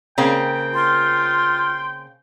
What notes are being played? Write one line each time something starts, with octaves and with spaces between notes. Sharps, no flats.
C#3 A#3 C4 G5
F4 C6